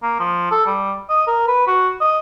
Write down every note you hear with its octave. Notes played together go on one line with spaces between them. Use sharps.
A#3
F3
A4
G3
D#5
A#4
B4
F#4
D#5